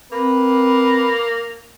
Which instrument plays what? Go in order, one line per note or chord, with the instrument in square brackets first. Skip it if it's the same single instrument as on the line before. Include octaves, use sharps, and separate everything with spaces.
[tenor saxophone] A#3 [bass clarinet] C4 [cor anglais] B4